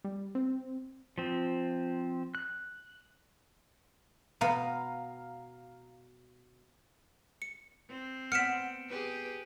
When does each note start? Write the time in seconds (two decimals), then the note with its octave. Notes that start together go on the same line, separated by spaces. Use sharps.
0.05 G3
0.35 C4
1.18 F3 C4
2.35 F#6
4.41 B2 B3 F5 A#5
7.42 C#7
7.89 C4
8.32 B3 F6 B6 C#7 D7 E7
8.89 G4 G#4 B4